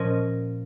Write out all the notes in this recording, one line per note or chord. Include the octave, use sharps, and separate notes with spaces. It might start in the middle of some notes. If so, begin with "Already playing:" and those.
Already playing: A#2 F3 C#4 D#5